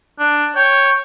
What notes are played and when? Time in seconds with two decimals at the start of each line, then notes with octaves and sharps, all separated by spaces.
0.19 D4
0.56 C#5 G5